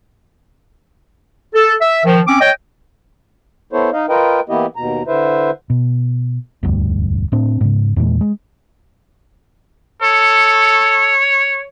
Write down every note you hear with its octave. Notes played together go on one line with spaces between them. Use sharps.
A4
E5
D#3 F3
C4 C#4 D6
C#5 D#5 G5
B3 E4 A4 C5 C#5
D#4 D#5 F5
F4 A#4 B4 D#5 G5
E3 A#3 B3 E4 G4 D#5
D#2 B2 A#5
D3 E4 B4 C5 E5
B2
E1 D2 G2
A2 C4 D4
G#2 C#3
E2 A#2 E3 G#3
G#3
A4 C#5